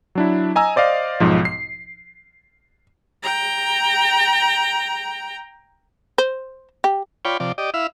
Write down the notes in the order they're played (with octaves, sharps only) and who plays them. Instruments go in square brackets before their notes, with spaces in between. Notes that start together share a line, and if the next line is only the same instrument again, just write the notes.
[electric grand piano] F#3 D4 E4
D#5 G#5 A#5 E6
C5 D5 D#5 F5
B1 G#2 F3
C7
[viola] G5 A#5
[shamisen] C5
G4
[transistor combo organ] F4 C#5 D5 G5 B5
C3 F3 D5
G4 D5 D#5
E4 E5 F5